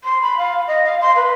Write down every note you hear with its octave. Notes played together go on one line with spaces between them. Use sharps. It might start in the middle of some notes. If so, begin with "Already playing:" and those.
C6
B5
F5
D#5
F5
C6
B4